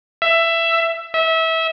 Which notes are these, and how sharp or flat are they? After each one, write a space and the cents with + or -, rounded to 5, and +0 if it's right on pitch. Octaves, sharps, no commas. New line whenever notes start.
E5 +15
E5 -25